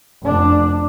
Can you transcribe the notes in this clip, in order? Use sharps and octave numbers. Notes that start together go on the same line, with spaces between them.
F1 D4